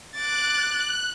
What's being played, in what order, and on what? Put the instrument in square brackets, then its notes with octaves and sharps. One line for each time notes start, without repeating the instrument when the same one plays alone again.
[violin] D6 A6 [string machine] F#6